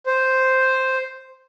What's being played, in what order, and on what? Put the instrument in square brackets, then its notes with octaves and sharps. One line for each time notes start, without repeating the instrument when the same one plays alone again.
[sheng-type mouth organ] C5